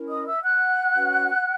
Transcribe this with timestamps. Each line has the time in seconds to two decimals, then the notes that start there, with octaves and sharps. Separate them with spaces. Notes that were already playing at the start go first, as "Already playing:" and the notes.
Already playing: C#4 E4 A#4
0.09 D#5 D#6
0.26 E5 E6
0.42 F#5 F#6
0.94 C#4 F#4 B4